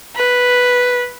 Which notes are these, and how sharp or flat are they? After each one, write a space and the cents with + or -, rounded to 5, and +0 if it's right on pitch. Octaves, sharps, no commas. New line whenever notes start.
B4 -5